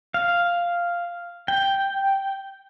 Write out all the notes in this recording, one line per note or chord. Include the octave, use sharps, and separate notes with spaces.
F5
G5